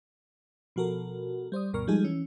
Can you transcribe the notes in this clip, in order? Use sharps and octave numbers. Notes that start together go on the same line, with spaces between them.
B2 F3 F#4 A4 A#4
G3 C5 D5 D#6
D2 G2 B2 A#4 C#6 F6
F3 G3 G#3 D#4 G#4 A4
E3 C#4